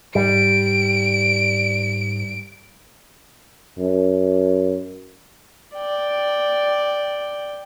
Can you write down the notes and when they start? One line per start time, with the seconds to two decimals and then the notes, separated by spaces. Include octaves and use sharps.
0.15 G#2 G3 D7
3.78 F#2
5.75 D5 G5